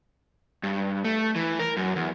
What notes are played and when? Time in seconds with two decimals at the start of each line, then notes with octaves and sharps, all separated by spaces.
0.63 G2
1.05 A3
1.36 E3
1.59 A#4
1.77 F#2
1.96 E2